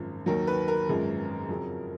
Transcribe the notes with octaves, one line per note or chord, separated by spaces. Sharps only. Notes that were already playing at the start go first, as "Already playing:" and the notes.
Already playing: G#1 F#2 F3
D#2 D#3 F#3 A#4
B4
A#4
G#1 F#2 F3 G#3
F2 C#3 F#3